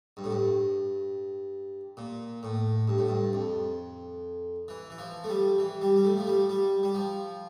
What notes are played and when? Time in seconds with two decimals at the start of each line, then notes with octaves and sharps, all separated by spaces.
0.17 G2
0.24 A2
0.31 G2
1.97 A#2
2.43 A2
2.88 G2
2.98 A2
3.09 G2
3.33 F2
4.68 E3
4.90 E3
4.98 F3
5.24 A3
5.29 G3
5.58 E3
5.81 G3
5.96 G3
6.04 A3
6.17 F3
6.27 G3
6.49 G3
6.83 G3
6.95 F3